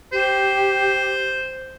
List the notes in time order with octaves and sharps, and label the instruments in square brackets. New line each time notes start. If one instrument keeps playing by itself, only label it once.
[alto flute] G4 [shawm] C5